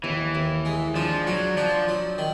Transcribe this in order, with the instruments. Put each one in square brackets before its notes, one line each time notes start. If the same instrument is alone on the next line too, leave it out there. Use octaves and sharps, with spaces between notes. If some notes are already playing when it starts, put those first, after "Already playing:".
[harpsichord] D#2 [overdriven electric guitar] E3
[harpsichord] D#2
G#3
[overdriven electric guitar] F3 [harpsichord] D4
[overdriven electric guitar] F#3 [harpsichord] D4
[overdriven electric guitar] F3 [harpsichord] D4
[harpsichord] F#3
D#3